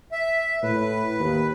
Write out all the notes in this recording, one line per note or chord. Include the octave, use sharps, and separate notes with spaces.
E5
A2 B4
D#2